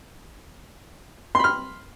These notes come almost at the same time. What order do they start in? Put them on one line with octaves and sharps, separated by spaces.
C6 B5 F6